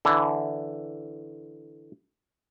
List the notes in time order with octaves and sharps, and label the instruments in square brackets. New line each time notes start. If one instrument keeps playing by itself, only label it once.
[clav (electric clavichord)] D3 E3